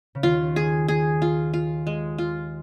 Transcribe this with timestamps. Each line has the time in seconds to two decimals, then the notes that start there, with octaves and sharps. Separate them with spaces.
0.15 C#3
0.23 D#2 D#3 F4
0.56 G#4
0.88 G#4
1.22 F4
1.54 F4
1.87 G#3
2.18 F4